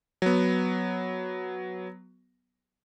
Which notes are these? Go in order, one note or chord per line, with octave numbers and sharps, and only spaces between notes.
F#3 B3